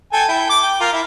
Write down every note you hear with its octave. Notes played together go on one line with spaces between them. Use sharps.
A4 G5 G#5
E4 G5
D6
G5
F4 A#4
E4